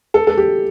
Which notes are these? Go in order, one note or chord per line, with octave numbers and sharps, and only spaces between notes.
A4
A4
G4